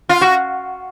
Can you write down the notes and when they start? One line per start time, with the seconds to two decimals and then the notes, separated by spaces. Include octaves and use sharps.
0.09 F4
0.21 F#4